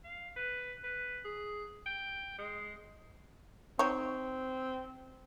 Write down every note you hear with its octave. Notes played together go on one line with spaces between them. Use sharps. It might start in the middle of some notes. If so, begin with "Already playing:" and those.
F5
B4
B4
G#4
G5
G#3
C4 D#4 C#5